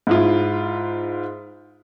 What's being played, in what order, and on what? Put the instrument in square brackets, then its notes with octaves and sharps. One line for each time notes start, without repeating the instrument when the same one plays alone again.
[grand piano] G#2 E4 F4